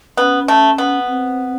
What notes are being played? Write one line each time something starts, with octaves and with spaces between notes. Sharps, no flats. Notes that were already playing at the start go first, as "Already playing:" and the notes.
B3 C#4
A3
B3
C4